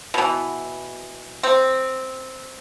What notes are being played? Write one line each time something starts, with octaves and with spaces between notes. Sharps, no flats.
B2 E3
C4